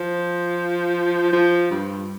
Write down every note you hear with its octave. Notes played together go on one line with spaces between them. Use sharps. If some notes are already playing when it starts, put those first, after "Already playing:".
Already playing: F3
F3
G2